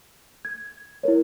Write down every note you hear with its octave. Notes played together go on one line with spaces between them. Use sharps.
G#6
E4 A#4 C#5